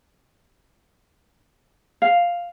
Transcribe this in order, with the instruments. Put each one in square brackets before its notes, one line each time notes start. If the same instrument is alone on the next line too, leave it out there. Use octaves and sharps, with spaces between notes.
[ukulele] F5